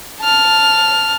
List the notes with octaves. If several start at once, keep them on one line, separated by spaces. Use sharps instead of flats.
A5 F6